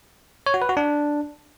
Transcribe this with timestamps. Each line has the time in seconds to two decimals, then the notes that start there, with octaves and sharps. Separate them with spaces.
0.46 C#5
0.54 F#4
0.62 B4
0.69 F#4
0.77 D4